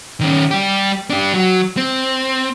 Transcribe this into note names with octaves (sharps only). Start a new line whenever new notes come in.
D#3 C#4
G3 G4
D4 G4
F#3
C4